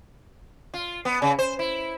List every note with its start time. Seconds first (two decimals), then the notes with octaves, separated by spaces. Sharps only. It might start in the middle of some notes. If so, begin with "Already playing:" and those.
0.74 F4
1.05 B3
1.22 C#3
1.39 C5
1.59 E4